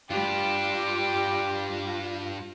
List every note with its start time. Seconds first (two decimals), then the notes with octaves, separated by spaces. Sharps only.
0.11 G2 G3 D4 F4 G4